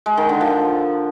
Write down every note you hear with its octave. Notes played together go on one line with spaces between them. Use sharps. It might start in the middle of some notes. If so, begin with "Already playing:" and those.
G#3
D#3
D3
F3